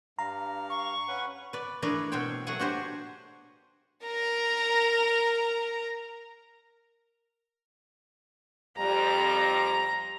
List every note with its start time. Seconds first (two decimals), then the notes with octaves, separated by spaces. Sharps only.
0.19 G2 F5 A#5
0.70 C#6
1.08 C#4 B4 F#5
1.53 B4 D5
1.82 E3 A3 D4 G#4 A#4 B4
2.12 B2 C4 C5 C#5 G5
2.47 F#3 A3 G#4 F#5 G#5
2.60 D4 F#4 G4 C5 C#5
4.06 A#4 A#5
8.78 F2 G3 A#5